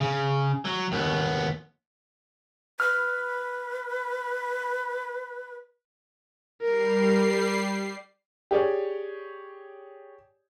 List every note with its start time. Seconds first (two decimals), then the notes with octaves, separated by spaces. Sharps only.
0.01 C#3
0.65 F#3
0.92 D#2 B3
2.80 B4 F6
6.62 G3 A#4 C7
8.51 G4 G#4 C#5 D5